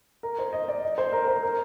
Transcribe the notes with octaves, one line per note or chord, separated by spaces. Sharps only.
A#4
C5
D#5
D5
D#5
C5
A#4
C5
A#4